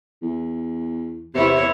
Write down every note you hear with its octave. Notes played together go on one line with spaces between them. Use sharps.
E2
E2 C3 E4 C#5